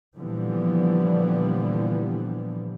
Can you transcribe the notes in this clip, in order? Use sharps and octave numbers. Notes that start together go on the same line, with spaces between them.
A#2 D3 E3 F3 G3 B3